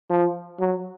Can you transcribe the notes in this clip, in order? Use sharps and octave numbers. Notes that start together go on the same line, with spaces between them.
F3
F#3